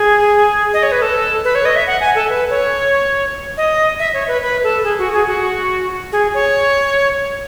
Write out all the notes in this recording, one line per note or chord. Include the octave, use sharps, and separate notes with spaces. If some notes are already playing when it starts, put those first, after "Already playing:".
Already playing: G#4
D#5
C#5
B4
A4
B4
C#5
D#5
E5
F#5
G#5
A4
B4
C#5
D#5
E5
C#5
B4
B4
A4
G#4
F#4
G#4
F#4
G#4
C#5